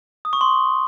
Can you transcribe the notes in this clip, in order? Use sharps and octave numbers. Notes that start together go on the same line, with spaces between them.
D#6
C#6
C6